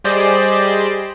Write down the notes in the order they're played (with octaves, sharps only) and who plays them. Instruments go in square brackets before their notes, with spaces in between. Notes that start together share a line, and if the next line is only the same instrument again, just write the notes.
[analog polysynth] G3 G4 G#4 C5 D5 D#5